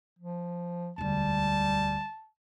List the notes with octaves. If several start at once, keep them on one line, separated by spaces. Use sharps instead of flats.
F3
E1 D2 G3 A5